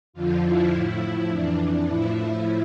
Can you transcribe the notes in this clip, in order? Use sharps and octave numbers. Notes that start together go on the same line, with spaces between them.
F2 D3 F3 F4
E4
A2 F3
E4
F2 E3 D4
D4
A2 F3 E4